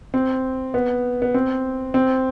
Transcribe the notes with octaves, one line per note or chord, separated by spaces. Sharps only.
C4
B3
B3
C4
C4